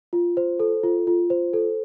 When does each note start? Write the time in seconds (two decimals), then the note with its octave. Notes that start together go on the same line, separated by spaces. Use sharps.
0.13 F4
0.37 C5
0.60 A4
0.84 F4
1.07 F4
1.30 C5
1.54 A4